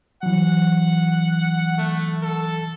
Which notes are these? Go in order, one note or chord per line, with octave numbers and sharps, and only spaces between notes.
E3 F#3 F#5
A3
A4